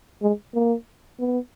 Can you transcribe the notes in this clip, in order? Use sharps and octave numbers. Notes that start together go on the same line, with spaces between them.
G#3
A#3
B3